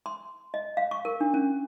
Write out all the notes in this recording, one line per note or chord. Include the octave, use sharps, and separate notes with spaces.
C6
D#5
F5
C#6
A#4
D4
C#4